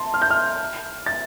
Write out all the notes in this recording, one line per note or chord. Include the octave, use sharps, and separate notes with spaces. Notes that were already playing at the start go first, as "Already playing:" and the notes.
Already playing: A5 C6
F6
G6
F6
A6